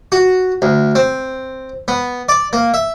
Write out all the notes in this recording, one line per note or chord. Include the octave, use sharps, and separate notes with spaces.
F#4
D2
C4
B3
D5
A#3
E5